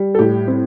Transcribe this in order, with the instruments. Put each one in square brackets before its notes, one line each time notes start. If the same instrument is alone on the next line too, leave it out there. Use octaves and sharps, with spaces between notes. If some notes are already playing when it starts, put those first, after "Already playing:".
Already playing: [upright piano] G3
A4
A2 G4
C4